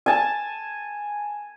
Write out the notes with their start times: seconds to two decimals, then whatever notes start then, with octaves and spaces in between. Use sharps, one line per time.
0.06 G#5 A5